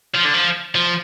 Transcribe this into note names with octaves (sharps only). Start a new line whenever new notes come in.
F3
D3
F3
F3